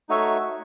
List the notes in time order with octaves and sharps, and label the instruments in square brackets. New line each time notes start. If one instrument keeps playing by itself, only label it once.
[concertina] A3 D#4 F#4 C#5 E5